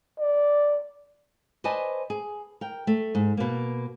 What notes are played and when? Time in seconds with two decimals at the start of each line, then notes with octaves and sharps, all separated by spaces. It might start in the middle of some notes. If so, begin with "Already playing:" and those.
0.20 D5
1.64 B4 C5 D5 D#5 G#5 A5
2.10 G#4
2.61 A#4 G5
2.87 A3
3.15 G#2
3.37 B2 A#3